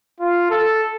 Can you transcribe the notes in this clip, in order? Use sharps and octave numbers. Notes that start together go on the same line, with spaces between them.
F4
A4